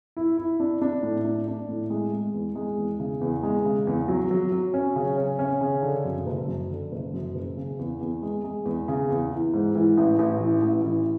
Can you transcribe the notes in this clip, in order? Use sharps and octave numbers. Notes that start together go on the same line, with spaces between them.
E4
E4
D4
D4
A2
D4
D4
A2
G#3
G#3
E2
G#3
E2
C#3
E2
G#3
C#3
E2
F#3
F#3
F#3
C#4
C#3
C#4
C#4
C#3
D3
F#2
F#1
F#2
D3
F#1
F#2
F#1
C#3
E2
E2
G#3
G#3
E2
C#3
E2
E3
G#2
E3
A1
A1
E3
A1
E3